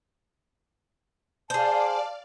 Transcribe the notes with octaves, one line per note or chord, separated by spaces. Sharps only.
G#4 C5 D5 F5 A5